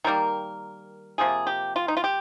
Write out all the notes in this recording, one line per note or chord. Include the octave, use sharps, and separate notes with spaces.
D#3 G3 A#3 A#4
C3 F3 A#3 G#4
G4
F4
D#4
F4
G4